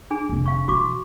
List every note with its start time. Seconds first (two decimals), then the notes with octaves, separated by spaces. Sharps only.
0.11 D4 G#4 G#5
0.29 F1 D3
0.46 F5 C#6
0.68 B2 E3 F#4 C#6 D6